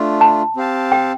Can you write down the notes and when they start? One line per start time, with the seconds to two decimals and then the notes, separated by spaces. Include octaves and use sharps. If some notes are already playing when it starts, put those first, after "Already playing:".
Already playing: A3 D4 F4
0.21 A5
0.56 C4 G4 F5 A5
0.92 G5